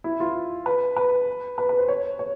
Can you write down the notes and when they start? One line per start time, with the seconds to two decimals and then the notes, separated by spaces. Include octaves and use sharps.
0.04 E4
0.20 F4
0.66 B4
0.96 B4
1.58 B4
1.69 B4
1.78 C5
1.88 C#5
2.19 C#5